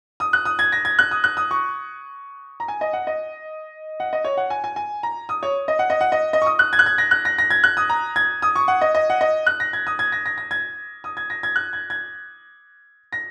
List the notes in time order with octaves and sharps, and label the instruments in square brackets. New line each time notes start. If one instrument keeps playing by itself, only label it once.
[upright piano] D#6
F#6
D#6
G#6
A#6
G#6
F#6
D#6
F#6
D#6
C#6
A#5
G#5
D#5
F#5
D#5
F#5
D#5
C#5
F#5
G#5
G#5
G#5
A#5
D#6
C#5
D#5
F#5
D#5
F#5
D#5
D#5
C#6
D#6
F#6
G#6
F#6
G#6
A#6
F#6
A#6
A#6
G#6
F#6
D#6
A#5
G#6
D#6
C#6
F#5
D#5
D#5
F#5
D#5
F#6
A#6
G#6
D#6
G#6
A#6
A#6
A#6
G#6
D#6
G#6
A#6
G#6
F#6
G#6
G#6
A#6